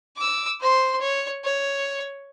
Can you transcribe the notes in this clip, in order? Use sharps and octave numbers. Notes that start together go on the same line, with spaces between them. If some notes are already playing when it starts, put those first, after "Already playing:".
D6 E6
C5 C6
C#5
C#5